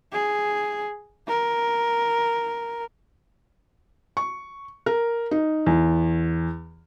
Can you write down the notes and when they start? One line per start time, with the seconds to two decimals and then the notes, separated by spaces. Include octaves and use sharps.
0.13 G#4
1.28 A#4
4.17 C#6
4.86 A#4
5.31 D#4
5.66 E2